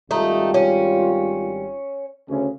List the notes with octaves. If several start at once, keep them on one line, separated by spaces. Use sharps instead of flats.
G#1 G3 A3 D#4 F4
C#4
D2 C#3 C#4